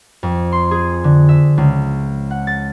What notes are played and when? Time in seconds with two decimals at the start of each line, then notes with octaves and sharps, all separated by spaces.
0.23 F2
0.52 C6
0.71 G#4
1.04 D3
1.29 E5
1.58 C#2
2.31 F#5
2.47 A6